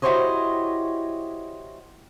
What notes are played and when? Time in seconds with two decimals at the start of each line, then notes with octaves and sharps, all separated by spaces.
0.02 E4 F#4 G4 C5 C#5 D#5